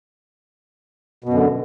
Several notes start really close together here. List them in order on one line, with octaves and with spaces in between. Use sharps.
B2 F#2 D3